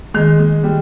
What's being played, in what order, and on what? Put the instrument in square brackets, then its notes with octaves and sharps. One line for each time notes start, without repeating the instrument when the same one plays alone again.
[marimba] D#3 [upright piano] G#3
[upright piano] G#3
G3